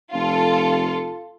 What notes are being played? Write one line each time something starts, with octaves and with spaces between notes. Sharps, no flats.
F1 F4 A4